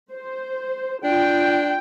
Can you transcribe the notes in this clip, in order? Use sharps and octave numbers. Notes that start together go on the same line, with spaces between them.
C5
D4 F4 G5